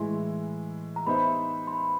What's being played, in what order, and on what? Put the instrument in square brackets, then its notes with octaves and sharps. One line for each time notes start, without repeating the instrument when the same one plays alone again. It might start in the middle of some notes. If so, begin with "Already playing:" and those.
Already playing: [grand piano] A2 E3 G#3 [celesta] C6
[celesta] A#5
[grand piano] B3 D#4 G4 C5 E5 [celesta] B5
[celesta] C6
B5